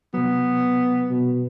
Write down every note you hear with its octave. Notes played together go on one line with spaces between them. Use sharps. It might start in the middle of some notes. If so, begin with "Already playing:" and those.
C3 F#3 B3
B2